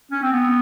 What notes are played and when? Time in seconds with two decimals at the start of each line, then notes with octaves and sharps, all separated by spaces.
0.11 C#4
0.22 C4
0.33 B3